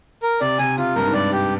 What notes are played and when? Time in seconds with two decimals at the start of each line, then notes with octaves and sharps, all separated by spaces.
0.23 A#4
0.41 C3 D5
0.59 C3 G#5
0.78 C3 F4
0.96 G2 A#4
1.06 G#2
1.13 G2 D5
1.32 G4